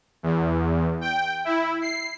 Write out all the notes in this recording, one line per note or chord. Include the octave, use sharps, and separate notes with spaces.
E2
G5
E4
C7